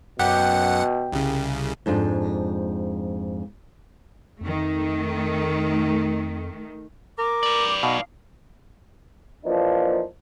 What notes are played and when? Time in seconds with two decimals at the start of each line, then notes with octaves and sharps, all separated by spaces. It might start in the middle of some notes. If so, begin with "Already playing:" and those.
0.19 F#2 B2 G4 F#5
1.12 C2 C#3
1.86 F2 G#2 D4 F4
4.41 F2 D#3 A3
7.18 A#4 D6
7.43 B4 D5
7.83 B2 D#4 F5
9.45 E3 F3 A#3 D4 D#4